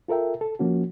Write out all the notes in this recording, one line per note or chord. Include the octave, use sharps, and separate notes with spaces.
F4 A4 A#4 E5 G5
A4
F3 A#3 C#4 F#4